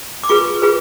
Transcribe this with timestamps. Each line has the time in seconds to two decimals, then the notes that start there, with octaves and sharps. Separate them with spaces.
0.24 D6
0.29 F4 G#4 B4 C#6
0.62 F4 G#4 B4